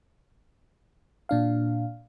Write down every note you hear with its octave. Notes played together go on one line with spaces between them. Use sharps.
A#2 D4 F5